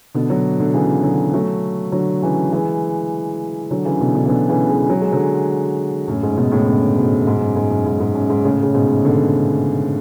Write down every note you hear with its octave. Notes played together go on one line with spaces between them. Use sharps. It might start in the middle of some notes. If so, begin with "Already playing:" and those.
B2 D3
D3 F#3
B2 D3
C#3 E3
D3 F#3
F#3 A3
D3 F#3
C#3 E3
E3 G#3
D3 F#3
C#3 E3
B2 D3
B2 D3
E3
B2 D3
C#3 E3
E3 G#3
F#3
G#3
D3 F#3
F#2 A2
G#2
G#2 B2
A2 C#3
B2 D3
G#2 B2
G#2 B2
F#2
G#2
F#2
G#2
G#2
F#2
G#2
A2 C#3
C#3
G#2 B2
B2 D3